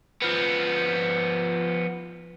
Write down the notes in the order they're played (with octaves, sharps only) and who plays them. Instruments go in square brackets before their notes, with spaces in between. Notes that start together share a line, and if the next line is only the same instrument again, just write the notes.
[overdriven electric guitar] F3 B3